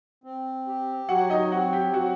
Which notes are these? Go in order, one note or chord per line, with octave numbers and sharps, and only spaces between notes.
C4
G4
F#3 F#4 F#5
D#4 D#5
C4 F#4 F#5
G4 G5
F#3 F#4 F#5